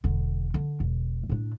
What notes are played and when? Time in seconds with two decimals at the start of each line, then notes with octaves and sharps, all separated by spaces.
0.04 E1 D3
0.54 D3
0.80 E1
1.29 A2 D4